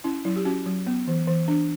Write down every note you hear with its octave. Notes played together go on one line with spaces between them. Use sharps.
C#4 E4
F#3 E4
G4
C#4 F#4
F#3
B3
E3
E3
D4